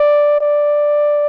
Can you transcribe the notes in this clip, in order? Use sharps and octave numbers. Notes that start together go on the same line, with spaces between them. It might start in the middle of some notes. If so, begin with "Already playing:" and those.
Already playing: D5
D5